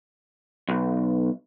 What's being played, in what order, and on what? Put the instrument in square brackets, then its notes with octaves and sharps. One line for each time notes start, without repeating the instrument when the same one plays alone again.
[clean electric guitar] B1